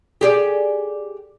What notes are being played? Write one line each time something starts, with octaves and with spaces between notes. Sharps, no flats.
G4 G#4 D5